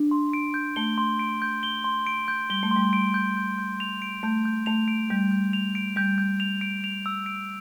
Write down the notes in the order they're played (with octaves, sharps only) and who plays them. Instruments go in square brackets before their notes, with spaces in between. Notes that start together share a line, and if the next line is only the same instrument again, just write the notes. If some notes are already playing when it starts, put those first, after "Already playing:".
Already playing: [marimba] D4
[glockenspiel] C6
D7
G6
[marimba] A3 [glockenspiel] G7
[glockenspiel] C6
D7
G6
G7
C6
D7
G6
[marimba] G3 [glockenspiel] G7
[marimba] A3
[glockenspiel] C6
[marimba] G3
[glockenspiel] D7
G6
G6
G6
F7
D7
[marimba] A3 [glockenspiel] G6
[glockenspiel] G6
[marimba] A3 [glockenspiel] F7
[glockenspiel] D7
[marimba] G3 [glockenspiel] G6
[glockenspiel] G6
F7
D7
[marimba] G3 [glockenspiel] G6
[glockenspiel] G6
F7
D7
F7
E6
D7